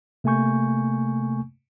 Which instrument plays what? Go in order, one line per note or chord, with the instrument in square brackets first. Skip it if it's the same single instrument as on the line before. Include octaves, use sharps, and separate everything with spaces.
[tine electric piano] C3 A3 A#3 G#5 C#6 G6